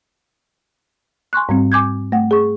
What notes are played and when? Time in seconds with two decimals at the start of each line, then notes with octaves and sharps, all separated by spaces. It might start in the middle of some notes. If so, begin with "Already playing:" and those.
1.33 G#5 C6 C#6 F#6
1.49 G#2 G3 C4
1.72 G#5 D6 G6 G#6
2.12 A3 F#5
2.31 G#4 C#6